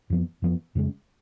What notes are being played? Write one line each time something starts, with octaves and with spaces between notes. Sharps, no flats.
F2 F3 B3
F2 F3 B3
F2 C#3 G#3 C#4